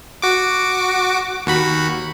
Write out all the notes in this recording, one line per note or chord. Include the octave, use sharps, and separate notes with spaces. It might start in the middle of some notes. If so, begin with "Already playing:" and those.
F#4 D6
D#2 F#4 B5